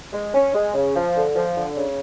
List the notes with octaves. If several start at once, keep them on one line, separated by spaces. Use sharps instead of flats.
G#3
C#4
G#3
C#3
F3
D3
F3
D3
C#3